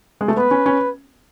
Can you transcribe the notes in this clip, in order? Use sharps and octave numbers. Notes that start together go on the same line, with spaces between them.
G#3
A3
B3 B4
C#4
C#4